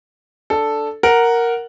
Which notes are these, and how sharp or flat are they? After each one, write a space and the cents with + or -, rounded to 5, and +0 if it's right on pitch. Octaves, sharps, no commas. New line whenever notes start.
D4 +0 A4 +0
A#4 +0 F#5 +0